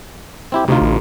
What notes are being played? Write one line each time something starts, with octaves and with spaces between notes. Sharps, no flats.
C4 E4 G4
D2 C3 D#4 F4
A1